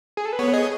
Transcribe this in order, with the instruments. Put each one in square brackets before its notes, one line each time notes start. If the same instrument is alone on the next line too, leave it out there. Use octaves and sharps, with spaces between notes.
[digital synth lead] G#4
A4
B4
[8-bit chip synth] B3 [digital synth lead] C#5
[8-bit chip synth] G#4 [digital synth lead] D#5